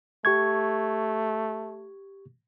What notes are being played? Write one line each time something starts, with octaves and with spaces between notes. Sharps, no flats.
A3 G4 C#6 G#6